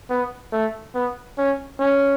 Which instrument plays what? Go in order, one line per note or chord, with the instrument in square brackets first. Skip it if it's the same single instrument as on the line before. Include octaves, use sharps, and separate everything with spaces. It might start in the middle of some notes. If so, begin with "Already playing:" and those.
[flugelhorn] B3
A3
B3
C#4
C#4